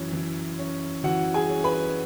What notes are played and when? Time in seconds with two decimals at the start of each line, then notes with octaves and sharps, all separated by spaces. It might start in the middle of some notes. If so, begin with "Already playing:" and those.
Already playing: F#2 E3 C#4
0.13 E3
0.59 C#4
1.04 E3 F#4 F#5
1.34 G#4 G#5
1.49 C#4
1.64 B4 B5